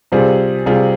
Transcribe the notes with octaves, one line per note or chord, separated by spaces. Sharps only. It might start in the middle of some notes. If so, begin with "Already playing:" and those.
C3 G3 C4 F4 G#4
C3 G3 C4 F4 G#4